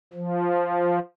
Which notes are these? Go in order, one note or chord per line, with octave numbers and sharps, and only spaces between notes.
F3